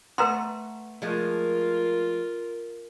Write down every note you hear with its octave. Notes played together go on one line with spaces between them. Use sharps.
A3 B4 F#5 A#5 C6
F3 G#3 A3 F4 A#4